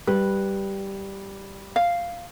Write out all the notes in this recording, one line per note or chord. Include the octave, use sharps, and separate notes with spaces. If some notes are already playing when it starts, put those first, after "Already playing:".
G3 B4
F5